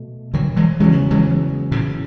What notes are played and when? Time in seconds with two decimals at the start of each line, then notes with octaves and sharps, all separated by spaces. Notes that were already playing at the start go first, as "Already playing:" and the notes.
Already playing: B2 A3
0.34 D3 F#3
0.56 E3 G#3
0.80 E2 C#3 E3 F#3 G#3 C#4
1.11 E3 G#3
1.71 A2 C#3